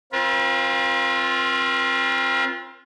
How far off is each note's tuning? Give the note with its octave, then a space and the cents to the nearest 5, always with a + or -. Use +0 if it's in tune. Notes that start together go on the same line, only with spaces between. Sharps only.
C4 +25 F4 +0 B4 -45